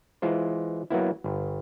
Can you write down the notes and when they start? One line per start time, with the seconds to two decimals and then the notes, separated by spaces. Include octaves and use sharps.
0.22 E3 G#3 F4 C5
0.90 F#3 A#3 B3 E4
1.24 G1